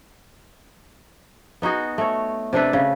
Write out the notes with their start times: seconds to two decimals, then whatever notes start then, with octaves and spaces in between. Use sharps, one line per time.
1.62 B3 D#4 F#4 G#4
1.98 A3 C#5
2.53 C3 D4 A4 B4
2.73 C#3